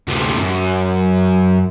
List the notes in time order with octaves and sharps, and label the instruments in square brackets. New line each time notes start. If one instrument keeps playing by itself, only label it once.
[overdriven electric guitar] D2 C3
F#2